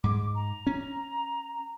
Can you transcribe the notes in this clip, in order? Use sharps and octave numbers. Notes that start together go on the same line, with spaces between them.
G#2 G#3 D6
A#5
C#4